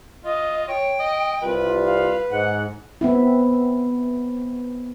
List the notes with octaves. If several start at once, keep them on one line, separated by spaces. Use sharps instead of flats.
F4 D#5
C#5 G5
D#5
C2 G3 F4 B4
F5
G#2 F#5
B3 C4 E4